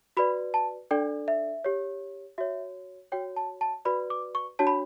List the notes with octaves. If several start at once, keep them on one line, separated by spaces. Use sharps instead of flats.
F#4 B4 D5 B5
A5
D4 A4 D5 G5
E5
G4 C#5
F#4 C#5 E5
F#4 C#5 G5
A5
A5
F#4 B4 D5 B5
D6
C#6
D4 F#4 C#5 A5
B5